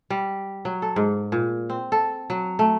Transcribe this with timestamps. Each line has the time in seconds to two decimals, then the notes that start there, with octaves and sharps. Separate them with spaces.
0.10 G3
0.65 F#3
0.82 A4
0.96 G#2
1.32 A#2
1.70 C4
1.92 A4
2.30 F#3
2.59 A3